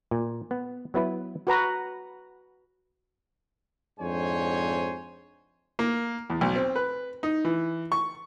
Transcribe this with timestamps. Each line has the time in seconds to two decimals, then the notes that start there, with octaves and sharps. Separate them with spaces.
0.11 A#2
0.51 B3
0.94 F#3 B3 E4 B4
1.47 F#4 B4 A#5
4.00 F2 G#2 D4 C5 C#5 G#5
5.79 A#3
6.30 E2
6.41 B1
6.56 C4
6.76 B4
7.23 D#4
7.45 E3
7.92 C#6